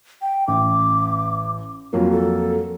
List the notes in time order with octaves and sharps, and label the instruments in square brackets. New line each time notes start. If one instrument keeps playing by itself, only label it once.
[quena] G5
[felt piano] A1 [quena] D6
[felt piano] F2 F#3 A#3 [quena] F4
[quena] A4